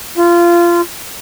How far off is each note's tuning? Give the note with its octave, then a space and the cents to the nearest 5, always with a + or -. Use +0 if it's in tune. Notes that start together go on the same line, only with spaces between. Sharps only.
F4 -20